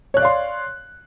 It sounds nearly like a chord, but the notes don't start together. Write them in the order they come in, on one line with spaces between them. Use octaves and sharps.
C#5 F#6 D5 F5 C6